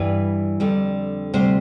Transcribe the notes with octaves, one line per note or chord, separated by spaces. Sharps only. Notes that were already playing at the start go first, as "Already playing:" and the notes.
Already playing: G2 E3 G3 B4
F2 D3 G3
D2 C3 G3 C5